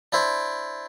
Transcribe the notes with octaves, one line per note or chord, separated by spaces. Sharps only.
D4 E4 C5